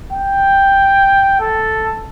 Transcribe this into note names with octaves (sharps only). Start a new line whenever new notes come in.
G5
A4